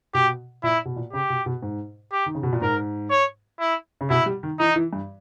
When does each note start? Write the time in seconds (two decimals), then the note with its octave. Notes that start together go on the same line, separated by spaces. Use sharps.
0.14 B2 G4
0.64 A#2 E4
0.85 B2
0.96 A#2
1.13 C#3 G4
1.30 B2
1.46 B2
1.62 G#2
2.12 G4
2.26 D#3
2.35 C#3
2.43 B2
2.53 A#2
2.61 G#2 A#4
3.11 C#5
3.60 E4
4.01 C#3
4.10 B2 E4
4.26 G3
4.43 D#3
4.59 E3 D#4
4.76 E3
4.93 G2